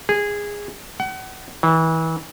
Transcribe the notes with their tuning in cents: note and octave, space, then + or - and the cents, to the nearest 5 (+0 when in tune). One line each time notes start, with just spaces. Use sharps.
G#4 -15
F#5 +35
E3 -30